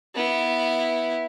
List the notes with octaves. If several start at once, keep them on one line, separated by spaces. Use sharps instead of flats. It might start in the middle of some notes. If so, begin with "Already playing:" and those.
B3 E4